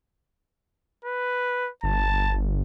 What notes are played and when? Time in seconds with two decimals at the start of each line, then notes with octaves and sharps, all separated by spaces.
1.05 B4
1.83 G1 A5